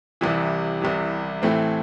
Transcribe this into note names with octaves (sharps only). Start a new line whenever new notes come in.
C2 C3 E3
C2 C3 E3
A2 E3 A3 C4